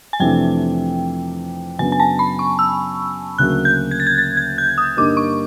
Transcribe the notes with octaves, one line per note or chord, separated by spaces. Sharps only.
G#5
F2 C3 E3 A3 D4 G5
F#2 C#3 F#3 B3 D4 G#5
G#5
A5
B5
C#6
E6
D2 C#3 F#3 A#3 F#6
G6
G#6
A6
G#6
A6
G#6
G6
D#6
G2 D3 G3 A#3 D#4 D6
C#6